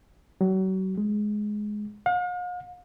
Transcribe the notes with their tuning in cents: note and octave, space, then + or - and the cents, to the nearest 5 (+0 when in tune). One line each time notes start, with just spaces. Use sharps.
F#3 +35
G#3 +10
F5 +45